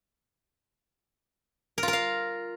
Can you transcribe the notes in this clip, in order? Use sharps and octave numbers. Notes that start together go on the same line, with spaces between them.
A#4
F4
A#4
F5